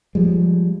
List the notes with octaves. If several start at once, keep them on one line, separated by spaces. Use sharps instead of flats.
F3 G3 G#3